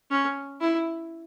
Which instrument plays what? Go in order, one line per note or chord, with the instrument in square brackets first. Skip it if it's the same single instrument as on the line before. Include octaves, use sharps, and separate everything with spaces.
[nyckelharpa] C#4
E4